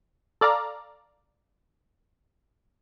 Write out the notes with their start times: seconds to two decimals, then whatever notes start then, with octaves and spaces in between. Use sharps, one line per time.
0.41 A4 D5 F5 A#5